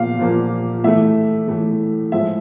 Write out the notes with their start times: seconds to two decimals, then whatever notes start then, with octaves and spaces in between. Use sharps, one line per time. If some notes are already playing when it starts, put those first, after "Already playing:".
Already playing: A#2 F3 A#3 F5
0.19 A#2 F3 A#3
0.84 A2 E3 A3 E5
1.48 A2 E3 A3
2.12 A2 F3 G#3 E5